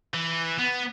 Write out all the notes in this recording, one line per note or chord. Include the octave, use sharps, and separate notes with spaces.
E3
B3